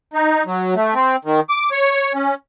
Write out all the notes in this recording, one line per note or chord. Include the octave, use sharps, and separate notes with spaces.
D#4
F#3
A3
C4
D#3
D6
C#5
C#4